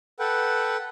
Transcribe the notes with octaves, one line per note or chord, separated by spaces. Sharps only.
A4 B4 F#5 G5